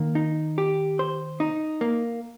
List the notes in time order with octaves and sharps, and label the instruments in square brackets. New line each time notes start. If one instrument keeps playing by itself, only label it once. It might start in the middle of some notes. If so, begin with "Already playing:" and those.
Already playing: [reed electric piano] D#3 [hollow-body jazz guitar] A#3
[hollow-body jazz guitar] D#4
G4
C5
D#4
A#3